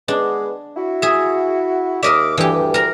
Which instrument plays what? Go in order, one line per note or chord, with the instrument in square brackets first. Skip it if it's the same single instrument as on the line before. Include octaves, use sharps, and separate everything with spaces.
[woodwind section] G#3 B3 [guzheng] D4
[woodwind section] E4 F#4
[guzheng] G#4 E5
[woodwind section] D#2 D6 [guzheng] A#4 D#5 E5
[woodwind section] D2 G2 [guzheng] E3 G4
[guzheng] A#4 A#5